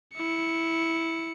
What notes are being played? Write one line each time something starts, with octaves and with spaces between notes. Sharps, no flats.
E4 C#7